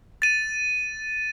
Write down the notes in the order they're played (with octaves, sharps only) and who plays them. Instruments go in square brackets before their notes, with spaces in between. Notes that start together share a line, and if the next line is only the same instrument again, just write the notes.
[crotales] A6 D#7